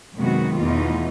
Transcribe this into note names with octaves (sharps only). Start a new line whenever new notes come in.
F#2 C3 D#3 G#3 B3 F#4
E2 B2 A3 D#4 F4